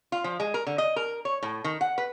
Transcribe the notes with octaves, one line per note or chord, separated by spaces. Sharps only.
F4
F3
G#3
A#4
D3
D#5
A#4
C#5
A2
D#3
F#5
B4